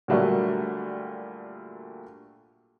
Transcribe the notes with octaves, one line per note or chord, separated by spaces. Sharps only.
A#2 D3 F#3 G3 A3 A#3